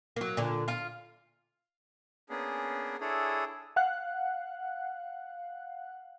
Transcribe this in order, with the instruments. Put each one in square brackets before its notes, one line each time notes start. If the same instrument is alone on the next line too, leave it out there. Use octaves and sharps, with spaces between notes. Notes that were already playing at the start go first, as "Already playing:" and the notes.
[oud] F#3 A#3
A#2 D3
F4 F5
[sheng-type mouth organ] A#3 B3 C#4 D4 G#4
D4 E4 G#4 A4 C#5
[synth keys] F5 F#5 F#6